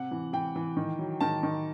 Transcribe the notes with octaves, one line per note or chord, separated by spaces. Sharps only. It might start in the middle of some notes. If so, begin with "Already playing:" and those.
Already playing: C3 F#5
E3
E3 G5
E3
D#3
F#3
D#3 A5
D#3